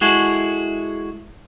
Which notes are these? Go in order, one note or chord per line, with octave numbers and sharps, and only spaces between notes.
G#3 E4 F#4 G#4 A4